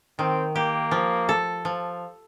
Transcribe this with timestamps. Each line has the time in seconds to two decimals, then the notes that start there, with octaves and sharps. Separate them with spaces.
0.19 D#3 C4
0.56 A#3 G4
0.91 F3
1.29 A4
1.65 F3